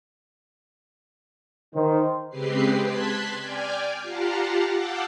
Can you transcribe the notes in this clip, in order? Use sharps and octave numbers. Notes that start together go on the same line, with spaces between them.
D#3 D#4 C5
C#3 G#3 C4 G4 B4 C7
A5 C6 F#6 G#6 B6
D5 G5 G#5 F6 G6
F4 G4 F5 F#5 A5 A#5
F5 F#5 A5 D6 E6 G6